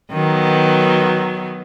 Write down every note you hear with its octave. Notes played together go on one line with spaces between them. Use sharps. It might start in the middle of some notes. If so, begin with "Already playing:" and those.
D#3 F#3 B3